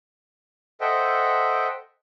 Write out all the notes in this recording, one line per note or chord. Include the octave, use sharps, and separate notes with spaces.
A4 C5 D#5 E5 F#5 G5